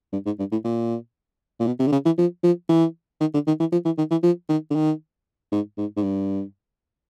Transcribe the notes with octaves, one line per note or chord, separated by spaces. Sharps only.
G2
G#2
G2
A2
A#2
A#2
B2
C3
D3
C#3
E3
F3
F3
E3
D#3
D3
D#3
E3
F3
E3
D#3
E3
F3
D#3
D3
D#3
G#2
G#2
G#2
G2